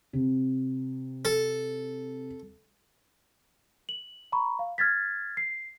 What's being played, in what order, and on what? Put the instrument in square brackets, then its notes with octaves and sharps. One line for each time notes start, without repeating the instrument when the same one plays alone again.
[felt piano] C3
[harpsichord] A4
[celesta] F#7
A#5 B5 C#6
F5
F6 G#6 A6 B6
C7